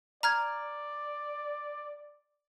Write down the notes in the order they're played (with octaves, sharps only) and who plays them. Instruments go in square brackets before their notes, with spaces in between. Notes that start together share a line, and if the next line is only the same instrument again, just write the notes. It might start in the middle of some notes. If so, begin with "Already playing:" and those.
[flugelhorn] D5 [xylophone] A#5 F6 G#6